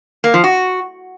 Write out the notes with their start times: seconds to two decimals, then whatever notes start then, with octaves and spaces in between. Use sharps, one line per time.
0.24 A#3
0.34 F3
0.44 F#4